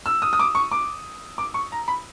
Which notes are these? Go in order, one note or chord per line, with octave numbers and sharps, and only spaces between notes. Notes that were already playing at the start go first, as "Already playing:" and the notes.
E6
D#6
D#6
D6
C#6
D6
D6
C#6
A#5
B5